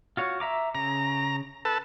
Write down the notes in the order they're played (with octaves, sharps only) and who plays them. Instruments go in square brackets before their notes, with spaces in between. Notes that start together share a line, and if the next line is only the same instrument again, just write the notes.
[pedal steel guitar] F4 F#4 C#5
E5 A#5 D6
[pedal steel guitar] C#3 [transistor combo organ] A#5
[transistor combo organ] A4 B4 A5